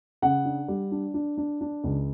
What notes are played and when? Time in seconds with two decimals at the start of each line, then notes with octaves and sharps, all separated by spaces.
0.22 C#3 F#5
0.45 D4
0.68 G3
0.92 D4
1.14 D4
1.37 D4
1.61 D4
1.84 C#2